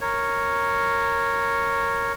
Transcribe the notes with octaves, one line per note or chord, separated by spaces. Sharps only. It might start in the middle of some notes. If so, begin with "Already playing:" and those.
A#4 C#5